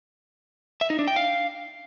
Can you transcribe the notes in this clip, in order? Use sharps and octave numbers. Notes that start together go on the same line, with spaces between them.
E5
D#4
D4
G5
F5